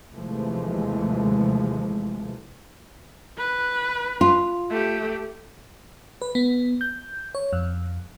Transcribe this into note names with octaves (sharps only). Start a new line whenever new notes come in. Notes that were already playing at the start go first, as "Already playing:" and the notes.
D#2 C3 E3 F3 G#3 A3
B4
F4
A3 G4
B4
B3
G6
C#5
F2